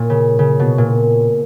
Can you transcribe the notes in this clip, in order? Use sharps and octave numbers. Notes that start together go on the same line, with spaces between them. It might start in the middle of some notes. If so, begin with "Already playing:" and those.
Already playing: A#2 C#4
C#3
C#3
B2
A#2